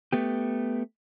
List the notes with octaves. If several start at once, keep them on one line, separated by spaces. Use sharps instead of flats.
A3 B3 G4